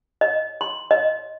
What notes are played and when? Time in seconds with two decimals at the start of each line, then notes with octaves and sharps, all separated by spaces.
0.21 D#5
0.61 C6
0.91 D#5